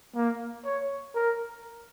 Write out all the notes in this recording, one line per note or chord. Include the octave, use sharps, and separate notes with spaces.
A#3
C#5
A#4